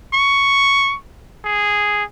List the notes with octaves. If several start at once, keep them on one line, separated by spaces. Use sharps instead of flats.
C#6
G#4